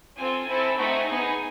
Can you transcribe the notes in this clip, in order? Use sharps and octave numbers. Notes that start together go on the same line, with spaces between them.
C4 F4 A4 G#5
C4 E4 A4
A3 C4 D#4 F#4 G#5
B3 D#4 G#4